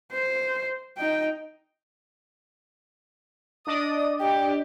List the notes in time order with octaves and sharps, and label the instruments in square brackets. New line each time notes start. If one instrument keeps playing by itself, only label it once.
[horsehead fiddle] C5
D#4 G5
[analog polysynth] D4 D5 D#5 [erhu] D#6
[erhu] G4 [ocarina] G5